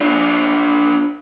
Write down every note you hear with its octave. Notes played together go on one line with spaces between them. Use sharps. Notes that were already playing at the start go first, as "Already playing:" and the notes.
D4 F4